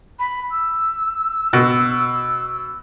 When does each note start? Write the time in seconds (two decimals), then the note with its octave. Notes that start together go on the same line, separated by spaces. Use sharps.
0.19 B5
0.51 E6
1.53 B2